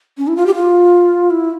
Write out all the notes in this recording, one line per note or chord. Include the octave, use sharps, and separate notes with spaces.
C#4
E4
F4
G4
F4
E4